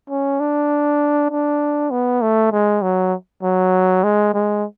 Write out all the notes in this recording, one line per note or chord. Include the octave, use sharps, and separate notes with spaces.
C#4
D4
D4
B3
A3
G#3
F#3
F#3
G#3
G#3